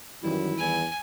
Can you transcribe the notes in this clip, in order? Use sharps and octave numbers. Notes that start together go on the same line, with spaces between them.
F#2 D#3 E3 G3 E4
E2 G#5